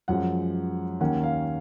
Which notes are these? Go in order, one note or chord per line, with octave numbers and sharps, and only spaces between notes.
F#2 F3 G#3 F#5
D#2 D#3 A#3 C#4 F#5
F5